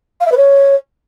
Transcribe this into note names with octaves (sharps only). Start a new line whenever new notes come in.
F5
E5
B4
C#5